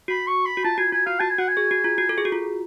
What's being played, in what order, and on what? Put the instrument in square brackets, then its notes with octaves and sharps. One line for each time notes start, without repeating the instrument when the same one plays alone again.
[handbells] F#4 [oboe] B5
[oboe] C#6
B5
[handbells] F#4
[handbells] F4 [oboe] A5
[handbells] F#4 [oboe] G#5
[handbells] F4 [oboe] G#5
[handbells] F#4 [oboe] F5
[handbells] F#4 [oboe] A5
[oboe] G#5
[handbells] F#4 [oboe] F#5
[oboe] G#5
[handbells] G#4
F#4
F4
F#4
A4
G#4
F#4
F4